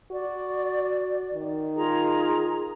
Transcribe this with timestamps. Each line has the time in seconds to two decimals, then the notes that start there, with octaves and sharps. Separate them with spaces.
0.12 F#4 D5
1.34 D#3
1.76 F4 G#4 A#5